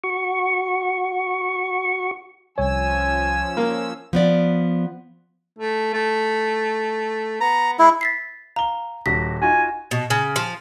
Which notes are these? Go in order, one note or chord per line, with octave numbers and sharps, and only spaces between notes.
F#4 C#6
C2 F3 C#4 C#5 G#5 E6
A#3
F3 B3 D5
A3
A3
B3 A#5
G#3 E4
A6 B6 C7
F5 A#5 G7
D#1 F#4 A#6 B6
D#4 F4 F#4 G#5
B2
C#3
F3